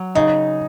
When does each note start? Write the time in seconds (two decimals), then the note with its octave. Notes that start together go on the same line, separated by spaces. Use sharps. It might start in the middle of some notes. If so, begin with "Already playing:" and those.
Already playing: F#3
0.15 C#3 D#4